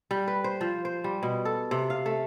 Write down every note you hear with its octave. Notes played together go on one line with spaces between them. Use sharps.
G3
B4
C5
F3
C5
G3
B2
A4
C3
F5
A3